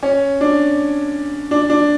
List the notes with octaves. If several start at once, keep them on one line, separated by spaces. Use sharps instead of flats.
C#4
D4
D4
D4